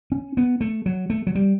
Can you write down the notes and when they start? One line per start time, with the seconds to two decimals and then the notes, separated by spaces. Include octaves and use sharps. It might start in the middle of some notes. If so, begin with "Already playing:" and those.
0.12 C#4
0.37 B3
0.61 A3
0.86 F#3
1.10 A3
1.27 F#3
1.35 G3